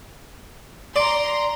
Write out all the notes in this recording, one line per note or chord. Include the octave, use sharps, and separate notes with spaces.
D5 A#5 C6